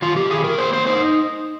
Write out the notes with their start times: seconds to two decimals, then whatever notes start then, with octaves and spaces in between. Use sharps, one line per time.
0.02 D#3 F4
0.16 G4
0.30 D#3 G#4
0.44 A#4
0.58 A#3 C5
0.73 C5
0.87 D#4 C5